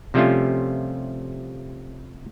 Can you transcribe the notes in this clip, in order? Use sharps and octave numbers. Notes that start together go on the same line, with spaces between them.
C3 F3 G3 A3 C#4 F4